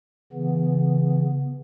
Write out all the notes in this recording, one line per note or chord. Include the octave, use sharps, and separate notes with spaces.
C#3 E3 B3